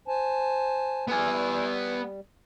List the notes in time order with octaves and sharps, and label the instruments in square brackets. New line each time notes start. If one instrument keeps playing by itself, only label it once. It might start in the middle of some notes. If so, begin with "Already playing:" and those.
[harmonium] C5 G#5 A5
[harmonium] G3 [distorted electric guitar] B3 G#5